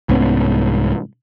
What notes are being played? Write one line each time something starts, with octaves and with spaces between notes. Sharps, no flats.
C2 G#2 B3 C#4